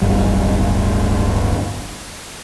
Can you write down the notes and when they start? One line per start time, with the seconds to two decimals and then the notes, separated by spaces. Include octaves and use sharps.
0.01 D1 G1 G3